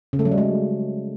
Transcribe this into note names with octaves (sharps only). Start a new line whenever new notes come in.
C#3
A3
F#3
G3
G#3